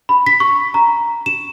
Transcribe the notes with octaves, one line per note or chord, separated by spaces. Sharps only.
B5
B6
C#6
A#5
E7